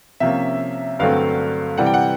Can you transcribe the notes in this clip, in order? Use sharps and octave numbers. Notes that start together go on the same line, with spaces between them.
C3 F3 A#3 C#4 E5
G2 D3 F#3 A3 C4 F5
C3 E3 G3 C4 F#5
G5
F#5